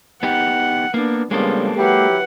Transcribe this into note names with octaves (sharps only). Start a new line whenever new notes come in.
B3 D#4 G4 F#5
A#3 B3 D4
C#3 F3 G3 G#3 A#3 B3 D4 A4
F#3 E4 G4 B4 F#5